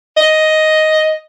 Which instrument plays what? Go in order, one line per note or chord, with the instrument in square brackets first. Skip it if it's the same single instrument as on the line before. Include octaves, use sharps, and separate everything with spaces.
[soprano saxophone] D#5